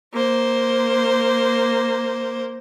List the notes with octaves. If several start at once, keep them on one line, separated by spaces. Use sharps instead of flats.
A#3 C5